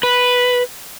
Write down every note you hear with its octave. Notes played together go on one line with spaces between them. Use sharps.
B4